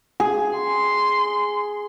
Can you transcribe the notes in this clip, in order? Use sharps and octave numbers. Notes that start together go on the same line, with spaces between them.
G#4
C6